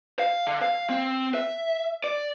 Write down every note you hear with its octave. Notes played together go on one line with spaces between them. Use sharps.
F5
D3
F5
C4
E5
D5